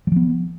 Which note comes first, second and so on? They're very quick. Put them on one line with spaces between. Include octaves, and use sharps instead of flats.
F#3 F3 B3